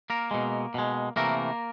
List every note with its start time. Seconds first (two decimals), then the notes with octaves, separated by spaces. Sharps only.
0.10 A#3 A#4
0.31 B2 G#3
0.74 B2 G#3
1.16 C3 E3 A3 A#3 A#4